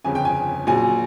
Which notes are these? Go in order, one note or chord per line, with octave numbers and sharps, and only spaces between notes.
G1 F2 C#3 G#5
G5
G#5
A#1 A#2 F#3 G#5